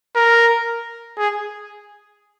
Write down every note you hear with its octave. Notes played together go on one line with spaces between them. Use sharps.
A#4
G#4